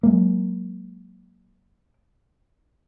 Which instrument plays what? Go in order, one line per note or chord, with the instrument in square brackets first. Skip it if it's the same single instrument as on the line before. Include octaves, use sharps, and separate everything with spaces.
[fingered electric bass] F#3 G#3 A#3